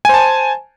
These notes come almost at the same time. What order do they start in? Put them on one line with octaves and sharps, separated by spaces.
G#5 C5 A5